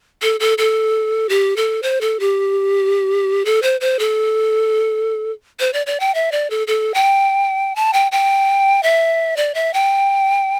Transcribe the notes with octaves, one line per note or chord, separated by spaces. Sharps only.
A4
A4
A4
G4
A4
C5
A4
G4
A4
C5
C5
A4
C5
D5
D5
G5
E5
D5
A4
A4
G5
A5
G5
G5
E5
D5
E5
G5